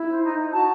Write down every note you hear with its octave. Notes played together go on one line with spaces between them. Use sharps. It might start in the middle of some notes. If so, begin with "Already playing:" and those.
Already playing: E4
C5
D#4
D#4
F#4 A5